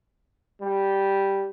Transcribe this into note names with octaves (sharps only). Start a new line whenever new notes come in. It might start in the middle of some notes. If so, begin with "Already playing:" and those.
G3